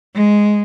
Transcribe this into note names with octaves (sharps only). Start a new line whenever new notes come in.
G#3